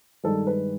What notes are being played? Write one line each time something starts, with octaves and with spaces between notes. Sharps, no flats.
G2 D#3 G#3 A4
B4